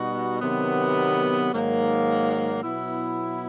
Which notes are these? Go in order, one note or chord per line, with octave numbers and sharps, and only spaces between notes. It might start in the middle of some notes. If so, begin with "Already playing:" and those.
Already playing: B2 G3 B3 D#4 F#4
C3 D#3 F#3 B3
G#2 D#3 F#3 A#3
B2 F#3 B3 E4